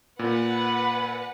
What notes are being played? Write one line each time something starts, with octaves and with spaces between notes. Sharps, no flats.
A#2 B4 F#5